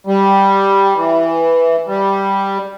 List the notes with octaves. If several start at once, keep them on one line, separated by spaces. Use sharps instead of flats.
G3
E3
G3